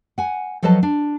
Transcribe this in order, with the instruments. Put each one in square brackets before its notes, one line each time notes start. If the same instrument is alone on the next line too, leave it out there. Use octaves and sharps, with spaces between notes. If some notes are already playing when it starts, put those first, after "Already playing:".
[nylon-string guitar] F#5 G#5
F3 F#3 A4 B4 D#5 A5
D4